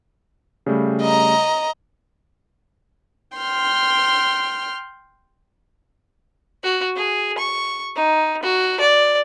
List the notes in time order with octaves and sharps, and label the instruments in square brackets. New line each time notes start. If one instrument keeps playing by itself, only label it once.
[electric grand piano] C#3 G3 A3
[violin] D#5 A#5
[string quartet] G5 C6 F6
[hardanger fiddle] F#4
G#4
C#6
D#4
F#4
D5